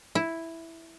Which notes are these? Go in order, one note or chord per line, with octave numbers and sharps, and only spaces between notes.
E4